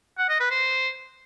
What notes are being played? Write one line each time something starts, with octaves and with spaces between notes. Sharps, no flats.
F#5
D#5
B4
C5